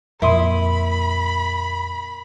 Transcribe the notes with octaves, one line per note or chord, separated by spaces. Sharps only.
F2 A#2 E4 A#4 B5 C6 D#6